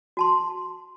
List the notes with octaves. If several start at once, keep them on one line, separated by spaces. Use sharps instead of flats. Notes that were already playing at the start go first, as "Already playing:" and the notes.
F#4 A5 C6